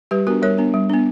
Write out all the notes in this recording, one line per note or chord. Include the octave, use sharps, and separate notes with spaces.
G3 G4 B4
B3 D4 F#4 A#4
G3 A#4 C#5
B3 D4
G3
B3 D4